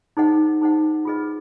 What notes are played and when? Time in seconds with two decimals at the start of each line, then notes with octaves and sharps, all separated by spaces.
0.17 D#4 G#4 C5 D#5 F#5
0.61 D#4 G#4 C5 D#5 F#5
1.05 F4 G#4 B4 D#5